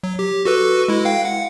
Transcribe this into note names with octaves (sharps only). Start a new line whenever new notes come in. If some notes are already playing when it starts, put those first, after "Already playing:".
F#3
G4
F#4 A4 B4
G#3 E4
F5 G5
F#5